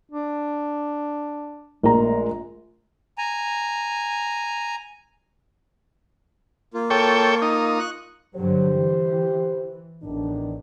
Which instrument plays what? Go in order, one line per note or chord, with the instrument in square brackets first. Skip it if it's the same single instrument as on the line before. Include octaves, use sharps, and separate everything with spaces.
[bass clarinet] D4
[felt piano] A#1 A#5 [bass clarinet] G#3 [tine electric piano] A3 A#4
[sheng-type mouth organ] G#5 A#5
A#3 F4
[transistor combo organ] A4 C#5 G5
D#4
[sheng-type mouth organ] C#6 F#6
[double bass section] G2 D3 F#3 [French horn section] G4 C5
[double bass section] E3
[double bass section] A1 [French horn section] E2 D#3 D4